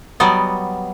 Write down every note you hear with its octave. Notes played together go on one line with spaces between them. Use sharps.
F#3 G3 B3 D5 D#5